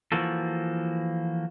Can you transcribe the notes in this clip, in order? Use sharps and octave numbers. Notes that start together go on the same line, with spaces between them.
E3 F3 A#3 F#4 A4